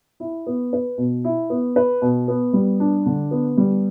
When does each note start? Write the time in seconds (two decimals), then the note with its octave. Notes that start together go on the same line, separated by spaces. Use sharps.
0.20 E4
0.47 B3
0.73 B4
0.98 B2
1.24 E4
1.50 B3
1.76 B4
2.02 B2
2.28 B3
2.53 G3
2.80 D4
3.06 D3
3.31 B3
3.57 G3